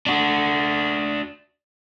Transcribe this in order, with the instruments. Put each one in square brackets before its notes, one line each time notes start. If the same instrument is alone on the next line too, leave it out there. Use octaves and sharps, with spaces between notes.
[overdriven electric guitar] D4 F#4